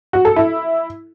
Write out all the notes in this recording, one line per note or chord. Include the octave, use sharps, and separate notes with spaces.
F#4
A4
E4